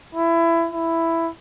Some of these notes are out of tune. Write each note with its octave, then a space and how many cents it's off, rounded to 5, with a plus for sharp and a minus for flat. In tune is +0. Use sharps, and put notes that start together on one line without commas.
E4 +20
E4 +5